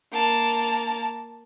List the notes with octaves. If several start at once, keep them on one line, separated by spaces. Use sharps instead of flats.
A#3 A5